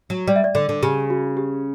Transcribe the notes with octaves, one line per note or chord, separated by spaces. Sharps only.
F#3
G3 D5
E5
D5
D3 D5
D3
C#3 G4
F#4
G4